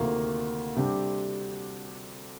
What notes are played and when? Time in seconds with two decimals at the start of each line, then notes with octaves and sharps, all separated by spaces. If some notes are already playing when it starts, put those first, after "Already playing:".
Already playing: D2 C3 D#3 A#3 F4
0.76 C3 G3 D4 G4